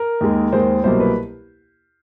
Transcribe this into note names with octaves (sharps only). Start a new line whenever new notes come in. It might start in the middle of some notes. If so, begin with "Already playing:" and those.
Already playing: A#4
D#2 D#3 G#3
D#2 D#3 G#3 C5
C2 B2 F#3 A#3 C5
B4